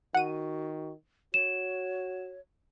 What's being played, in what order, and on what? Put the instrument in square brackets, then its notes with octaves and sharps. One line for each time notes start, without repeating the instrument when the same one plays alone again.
[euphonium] D#3 [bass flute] F#4 [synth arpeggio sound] F#5 D#7
[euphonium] F#4 [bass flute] C#5 [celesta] E7